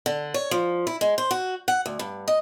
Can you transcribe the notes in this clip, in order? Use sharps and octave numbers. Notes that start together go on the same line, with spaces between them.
D3
C#5
F3
E4
G#3
C5
F#4
F#5
D2
G2
D#5